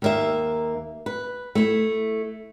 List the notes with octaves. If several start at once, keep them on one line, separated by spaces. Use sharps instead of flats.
D#2 A#3 E5
B4
A3 E4